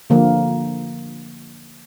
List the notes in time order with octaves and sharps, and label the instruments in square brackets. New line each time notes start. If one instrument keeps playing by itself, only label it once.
[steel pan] D3 F3 A#3